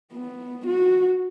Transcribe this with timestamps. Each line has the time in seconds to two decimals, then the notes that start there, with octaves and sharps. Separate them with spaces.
0.12 B3
0.66 F#4